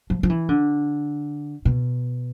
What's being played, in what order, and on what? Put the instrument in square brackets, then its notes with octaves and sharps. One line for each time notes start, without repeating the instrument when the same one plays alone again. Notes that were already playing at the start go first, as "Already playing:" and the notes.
[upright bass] F3
F3
E3
D3
B2